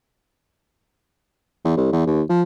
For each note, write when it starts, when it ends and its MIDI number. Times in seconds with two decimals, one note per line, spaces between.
1.64 1.74 40
1.77 1.89 36
1.92 2.04 40
2.07 2.22 39
2.29 2.42 53